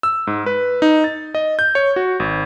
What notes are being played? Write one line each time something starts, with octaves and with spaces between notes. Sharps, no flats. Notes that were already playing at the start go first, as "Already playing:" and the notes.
E6
G#2
B4
D#4
A6
D#5
G6
C#5
F#4
G#1